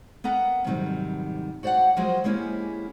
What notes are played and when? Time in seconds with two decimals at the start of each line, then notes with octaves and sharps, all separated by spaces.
0.24 B3 A#4 F#5 A#5
0.64 F2 G#2 C3 D#3 F#3 G3
1.63 F#4 C5 D5 F5 F#5
1.97 F3 F#3 G#3 F#4 A#4 C5
2.24 G#3 A#3 C#4 E4 G4 G#4